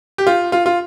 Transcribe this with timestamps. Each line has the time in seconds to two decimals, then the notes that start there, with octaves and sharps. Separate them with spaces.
0.18 G4
0.27 F4
0.52 F4
0.66 F4